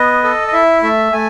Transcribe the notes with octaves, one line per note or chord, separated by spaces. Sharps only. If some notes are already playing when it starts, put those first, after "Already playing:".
Already playing: B3 D#5
A4
D#5
E4 E5
A3 E5
A3 G#5